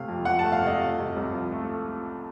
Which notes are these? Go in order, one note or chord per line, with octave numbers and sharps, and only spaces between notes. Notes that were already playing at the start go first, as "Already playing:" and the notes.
Already playing: C3 A3 F5
F2
F3 F#5
A5
A3
F5
C3
D#5
A3
C3
C2
F3
A3